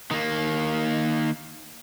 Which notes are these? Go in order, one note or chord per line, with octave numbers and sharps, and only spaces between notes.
D#3 A#3